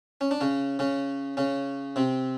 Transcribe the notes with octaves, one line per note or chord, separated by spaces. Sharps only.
C#4
D4
C#3 C#4
C#3 C#4
C#3 C#4
C3 C4